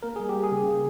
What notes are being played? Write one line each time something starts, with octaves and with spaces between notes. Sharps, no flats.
A#3 A#4
G3 G#4
G4
A#3
G#4
C#3
A#3